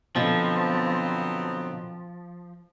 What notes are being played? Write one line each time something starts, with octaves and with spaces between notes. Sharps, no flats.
B2 D3 F3 F#3 B3 C4